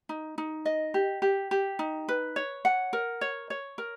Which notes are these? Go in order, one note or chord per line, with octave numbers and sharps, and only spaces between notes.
D#4
D#4
D#5
G4
G4
G4
D#4
B4
C#5
F#5
A#4
C#5
C#5
A#4